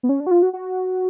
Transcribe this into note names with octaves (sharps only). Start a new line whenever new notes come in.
B3
C#4
D4
F#4
F4
F#4
F#4